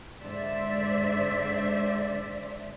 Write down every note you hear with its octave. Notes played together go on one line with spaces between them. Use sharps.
G#2 D3 C5 D5 E5